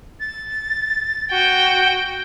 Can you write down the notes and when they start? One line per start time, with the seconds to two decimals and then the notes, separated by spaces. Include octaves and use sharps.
0.20 A6
1.31 F#4 G5